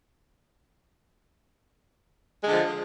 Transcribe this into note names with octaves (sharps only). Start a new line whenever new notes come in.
D3 F3 G#3